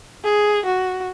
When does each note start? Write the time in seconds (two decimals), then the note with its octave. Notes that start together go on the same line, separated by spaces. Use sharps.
0.24 G#4
0.65 F#4